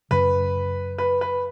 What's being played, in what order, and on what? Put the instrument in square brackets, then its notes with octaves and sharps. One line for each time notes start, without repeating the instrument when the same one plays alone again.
[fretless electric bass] F#2 C#3 F#3 [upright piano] B4
[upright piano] B4
B4